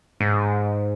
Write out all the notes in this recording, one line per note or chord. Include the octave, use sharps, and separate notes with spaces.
G#2